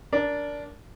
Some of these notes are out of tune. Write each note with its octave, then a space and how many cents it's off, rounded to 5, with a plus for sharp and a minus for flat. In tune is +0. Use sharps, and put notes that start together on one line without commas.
D4 -15 A#4 +0